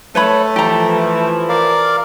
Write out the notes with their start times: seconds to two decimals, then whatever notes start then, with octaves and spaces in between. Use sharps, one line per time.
0.15 A3 A4 B4 C#5 B5
0.56 E3 F3 E4 G4 A#5
1.49 A#4 D5 F5